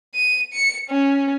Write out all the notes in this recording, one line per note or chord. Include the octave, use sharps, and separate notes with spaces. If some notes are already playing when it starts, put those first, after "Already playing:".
D#7
C#7
C#4